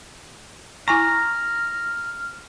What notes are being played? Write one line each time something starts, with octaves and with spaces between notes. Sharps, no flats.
E4 G#5 A#5 C#6 F6